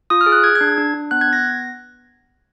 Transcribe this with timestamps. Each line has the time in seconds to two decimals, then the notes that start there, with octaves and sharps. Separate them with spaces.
0.10 F4 D#6
0.21 F6
0.26 G#4
0.32 F#6
0.43 G#4 G#6
0.56 G#6
0.61 D4
0.78 D4
0.94 D4
1.11 B3 F#6
1.21 G#6
1.28 B3 A#6